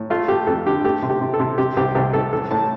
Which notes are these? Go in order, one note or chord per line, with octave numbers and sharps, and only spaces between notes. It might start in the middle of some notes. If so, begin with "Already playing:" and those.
Already playing: A2
A3 F4
A3 G4
F2 A4
D3 G4
A3 G4
C3
G4
C3
A4
C3
C3 G4
C2 G4
C2 G4
C2 A4
A1 A4
A2 A5